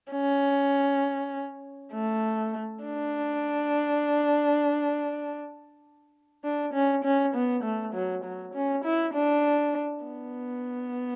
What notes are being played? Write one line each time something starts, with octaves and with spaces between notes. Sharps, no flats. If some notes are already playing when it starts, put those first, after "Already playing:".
C#4
A3
D4
D4
C#4
C#4
B3
A3
F#3
F#3
C#4
E4
D4
B3